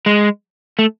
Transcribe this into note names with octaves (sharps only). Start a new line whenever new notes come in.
G#3
A3